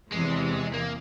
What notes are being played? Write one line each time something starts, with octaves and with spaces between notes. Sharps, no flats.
E2 C3 E3 G#3
A#3